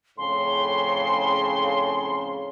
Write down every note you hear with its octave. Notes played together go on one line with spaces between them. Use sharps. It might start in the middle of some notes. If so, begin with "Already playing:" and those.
F2 A2 C#3 C6